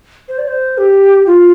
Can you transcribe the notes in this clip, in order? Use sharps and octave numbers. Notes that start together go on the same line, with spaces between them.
C5
D5
C5
G4
F4